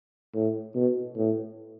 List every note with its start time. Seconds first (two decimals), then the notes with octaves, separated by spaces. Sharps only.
0.35 A2
0.75 B2
1.16 A2